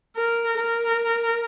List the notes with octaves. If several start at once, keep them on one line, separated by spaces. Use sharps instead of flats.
A#4
A#4